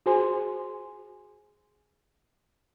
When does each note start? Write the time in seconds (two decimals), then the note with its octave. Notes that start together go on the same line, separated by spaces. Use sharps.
0.06 F#4 G#4 C5 G#5 C6